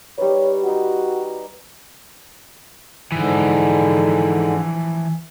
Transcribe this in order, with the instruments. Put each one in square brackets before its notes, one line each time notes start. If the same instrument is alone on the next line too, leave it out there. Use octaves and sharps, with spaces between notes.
[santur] G3 D#4 B4 [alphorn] C#5
[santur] D#4 D#5 [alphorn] F#4
[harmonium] G#2 D3 [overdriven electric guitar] E3 F3